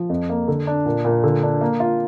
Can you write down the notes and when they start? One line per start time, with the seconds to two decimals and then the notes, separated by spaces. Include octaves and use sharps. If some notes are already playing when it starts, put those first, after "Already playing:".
Already playing: F3
0.10 F2
0.30 A#3
0.48 D3
0.67 D4
0.86 A#2
1.05 A#2
1.24 D3
1.43 D4
1.61 A#3
1.80 F4